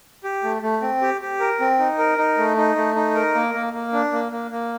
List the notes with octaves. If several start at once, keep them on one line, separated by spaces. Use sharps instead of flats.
G4
A3
A3
C4
G4
G4
A#4
C4
D#4
A#4
D#4
A3
D#4
A3
D#4
A#4
A#3
A#3
A#3
D4
A#3
A#3
A#3